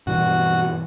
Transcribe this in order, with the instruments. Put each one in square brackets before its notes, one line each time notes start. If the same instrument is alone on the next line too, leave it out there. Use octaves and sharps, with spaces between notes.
[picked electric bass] G2 B2 E3 [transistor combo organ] F#4